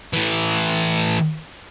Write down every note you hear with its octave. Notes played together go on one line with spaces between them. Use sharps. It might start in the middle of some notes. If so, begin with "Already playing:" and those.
A2 E3